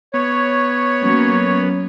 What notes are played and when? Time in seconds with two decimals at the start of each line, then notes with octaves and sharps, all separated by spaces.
0.14 B3 C#5
1.00 F#3 A#3 C#4